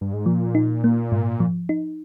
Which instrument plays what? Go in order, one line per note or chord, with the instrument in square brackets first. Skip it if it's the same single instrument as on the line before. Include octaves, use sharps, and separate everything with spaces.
[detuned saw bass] G2
G#2
[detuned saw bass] A#2 [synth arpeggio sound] F3
[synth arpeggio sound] D#4
A#3
G#2
F3
D#4